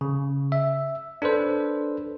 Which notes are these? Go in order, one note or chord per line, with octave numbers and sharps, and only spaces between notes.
C#3
E5
D4 A4 B4 C5